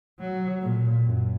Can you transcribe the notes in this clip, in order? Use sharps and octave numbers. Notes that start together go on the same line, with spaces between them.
F#3
A#2
F#2